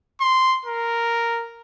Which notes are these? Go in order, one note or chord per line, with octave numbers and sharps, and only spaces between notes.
C6
A#4